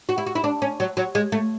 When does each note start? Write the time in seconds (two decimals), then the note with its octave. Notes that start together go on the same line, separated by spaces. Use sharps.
0.09 F#4
0.18 E4
0.26 F#4
0.35 E4
0.44 D4
0.62 C#4
0.80 F#3
0.97 F#3
1.15 G#3
1.32 A3